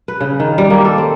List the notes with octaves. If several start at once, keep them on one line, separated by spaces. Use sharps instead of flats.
B4
C#3
D#3
G3
A#3
A4
C4